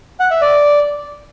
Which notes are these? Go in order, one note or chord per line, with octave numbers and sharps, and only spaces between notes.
F#5
E5
D5